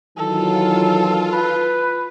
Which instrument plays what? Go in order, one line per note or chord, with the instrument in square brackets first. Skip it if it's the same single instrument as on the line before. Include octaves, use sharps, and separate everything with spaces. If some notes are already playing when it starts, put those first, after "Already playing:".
[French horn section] D#3 E3 F#3 [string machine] F4 [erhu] A4
[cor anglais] B4